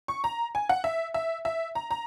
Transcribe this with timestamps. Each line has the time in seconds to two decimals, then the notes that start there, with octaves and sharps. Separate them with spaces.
0.08 C#6
0.24 A#5
0.55 G#5
0.69 F#5
0.84 E5
1.14 E5
1.45 E5
1.75 A#5
1.91 A#5